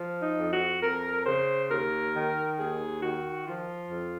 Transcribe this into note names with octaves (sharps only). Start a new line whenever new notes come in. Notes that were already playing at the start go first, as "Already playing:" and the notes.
Already playing: F3
D#4
F2
F#4
F2 A#4
C#3 C5
D#2 A#4
D#3
D#2 G#4
D#3 F#4
F3 F4
F2